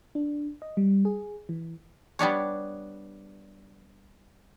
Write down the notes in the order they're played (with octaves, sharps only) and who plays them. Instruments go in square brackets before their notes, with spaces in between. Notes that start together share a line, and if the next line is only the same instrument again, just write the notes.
[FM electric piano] D4
D#5
G3
G#4
E3
[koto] G3 B3 D4 C#5